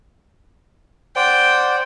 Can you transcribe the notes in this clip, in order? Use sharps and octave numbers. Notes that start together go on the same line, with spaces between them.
C5 D5 F#5 G5